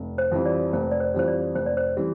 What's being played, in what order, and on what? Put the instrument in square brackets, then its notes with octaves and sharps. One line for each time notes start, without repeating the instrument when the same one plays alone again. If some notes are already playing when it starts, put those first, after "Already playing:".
Already playing: [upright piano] F1
[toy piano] C5
[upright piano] F2 E3 G3 C4
[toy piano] D5
[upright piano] F1 [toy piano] C5
[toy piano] D5
C5
[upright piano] F2 E3 G3 C4 [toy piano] C5
[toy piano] D5
[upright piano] F1 [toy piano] C5
[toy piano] D5
C5
[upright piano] E3 G3 C4